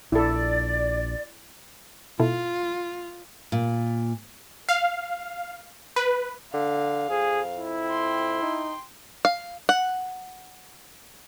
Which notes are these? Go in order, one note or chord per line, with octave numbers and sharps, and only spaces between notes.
A#1 E4 A4 D5
B2 E4 F4 A4
A#2
F5
B4
D3 F5
F2 G#4
E4
G5 C6
D#4
F5
F#5